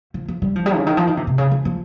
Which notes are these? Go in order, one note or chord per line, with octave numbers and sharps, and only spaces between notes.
F3
F3
G3
F3
G3
C#3
D#3
F3
D#3
C3
C3
C#3
F3
F3